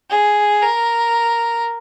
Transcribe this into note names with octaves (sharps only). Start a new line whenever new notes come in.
G#4
A#4